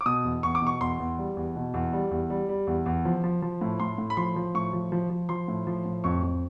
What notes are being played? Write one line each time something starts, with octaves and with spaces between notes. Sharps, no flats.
D6
B2 D#6
E2
E2 C#6
D6
B2 C#6
E2 C6
E2
G3
E2
B2
E2
G3
E2
G3
G3
E2
E2
F3
F3
F3
A2
A2 C6
A2
B5
F3 C6
F3
A2 C#6
F3
F3
F3
F3 C6
A2
F3
A2
F2 C#6
F2